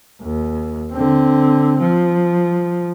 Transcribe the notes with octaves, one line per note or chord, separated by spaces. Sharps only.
D#2
D3 C4
F3